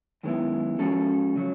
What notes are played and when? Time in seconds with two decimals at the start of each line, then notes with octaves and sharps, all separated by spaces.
0.23 F#2 D#3 G#3 B3 E4
0.79 F3 G#3 C#4 F#4 A4
1.36 C#3 F#3